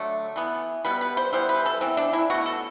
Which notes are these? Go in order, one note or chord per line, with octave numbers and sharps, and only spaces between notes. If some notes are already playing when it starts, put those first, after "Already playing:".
Already playing: D3 F#3 A3
E3 B3
B2 G3 B3 B4
B4
C5
E3 G3 B3 C5
B4
A4
E3 B3 C4
D4
E4
B2 A3 F#4
A4